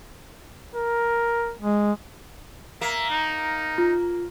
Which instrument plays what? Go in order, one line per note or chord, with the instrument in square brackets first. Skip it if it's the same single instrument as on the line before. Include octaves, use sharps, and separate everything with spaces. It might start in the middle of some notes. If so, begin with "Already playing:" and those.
[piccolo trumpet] A#4
[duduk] G#3
[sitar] A#3 [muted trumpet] E5
[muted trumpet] D#4
[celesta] F4